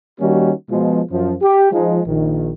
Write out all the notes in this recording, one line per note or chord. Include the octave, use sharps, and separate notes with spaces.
D#3 G3 A#3 C#4 D#4 F#4
B2 F3 G#3
F#2 F3
G4
F3 G#3 D#4
A#1 D#3